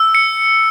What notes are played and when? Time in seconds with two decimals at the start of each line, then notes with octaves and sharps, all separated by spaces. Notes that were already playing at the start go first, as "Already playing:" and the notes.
Already playing: E6
0.15 C#7